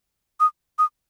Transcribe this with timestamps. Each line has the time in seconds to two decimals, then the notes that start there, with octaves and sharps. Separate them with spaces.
0.40 D#6
0.79 D#6